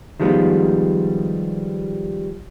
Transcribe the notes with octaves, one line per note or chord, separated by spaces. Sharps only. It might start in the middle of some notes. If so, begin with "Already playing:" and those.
D#3 F3 G3 G#3 B3